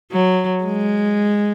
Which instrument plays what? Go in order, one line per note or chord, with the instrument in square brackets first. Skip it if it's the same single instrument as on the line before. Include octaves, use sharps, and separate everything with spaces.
[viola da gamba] F#3
G#3